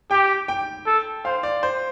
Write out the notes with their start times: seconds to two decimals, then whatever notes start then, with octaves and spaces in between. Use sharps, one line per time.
0.11 G4 G5
0.48 G5
0.86 A4
1.25 C5 F5
1.43 D5
1.63 C5